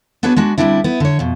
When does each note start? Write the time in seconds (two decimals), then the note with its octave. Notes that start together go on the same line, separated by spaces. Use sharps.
0.23 B3 D4 F#4 G#4 B4 C#5
0.36 G#3 D4 F#4
0.58 D2 F#3 G3 C4 D4 E4
0.84 B3 E4
1.00 D3 C#5
1.19 F2 B2